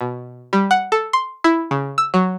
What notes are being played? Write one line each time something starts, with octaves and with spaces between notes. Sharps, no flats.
B2
G3
F#5
A4
C6
E4
C#3
E6
F#3